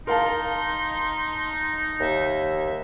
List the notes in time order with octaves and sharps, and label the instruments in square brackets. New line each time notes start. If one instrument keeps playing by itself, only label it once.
[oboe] D#4 [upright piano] A#4 F5 A5 [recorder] C6
[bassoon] D#2 [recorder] E5